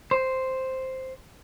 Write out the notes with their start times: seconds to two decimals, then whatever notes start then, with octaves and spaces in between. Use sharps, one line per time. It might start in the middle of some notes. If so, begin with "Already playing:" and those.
0.11 C5